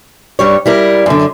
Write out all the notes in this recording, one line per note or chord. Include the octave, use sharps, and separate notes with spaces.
G2 G3 C#5
G3 E4 A#4
F#2 D3